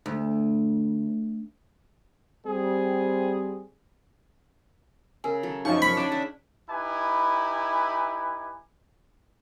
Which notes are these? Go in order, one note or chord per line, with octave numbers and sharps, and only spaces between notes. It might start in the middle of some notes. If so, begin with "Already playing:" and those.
D2
G3 C4 G#4
C#3 A#4 G#5
F#3 A4
F#2 F3 D#4 C#5 D#5 C#6
B5
C#4 D4 G5 G#5
C#3 E5 F#5
D#4 E4 G4 B4 G#5